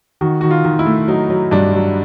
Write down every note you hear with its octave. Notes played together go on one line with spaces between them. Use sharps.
D#3 F#4
D#3 F#4
F4
D#3
E4
A3
F#3 D#4
F#3
G2 D4
F#3